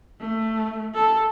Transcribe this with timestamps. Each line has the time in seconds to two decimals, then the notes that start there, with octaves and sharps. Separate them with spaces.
0.20 A3
0.95 A4